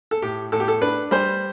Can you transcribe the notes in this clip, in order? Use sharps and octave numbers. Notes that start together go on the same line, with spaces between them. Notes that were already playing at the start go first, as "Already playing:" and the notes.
A4
A2 G4
A2 A4
G4
A4
D4 B4
G3 C5